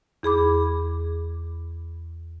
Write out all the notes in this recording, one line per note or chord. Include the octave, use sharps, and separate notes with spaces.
E2 G#4 B5 D6